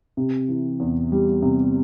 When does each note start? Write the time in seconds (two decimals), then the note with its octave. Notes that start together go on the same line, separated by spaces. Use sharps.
0.17 C3
0.49 E3
0.80 E2
1.12 G3
1.42 C3